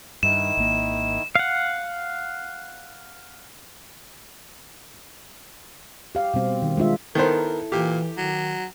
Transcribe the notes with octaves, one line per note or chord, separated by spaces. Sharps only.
G2 D#3 E4 E7
G#1 A#3
F5 F#5
G4 F5
B2 G3 C4
D#3
G#3 D4 F4 E5
D#3 B3 E4 A4 A#4 C5
A#2 E3 G4
D#3 F#3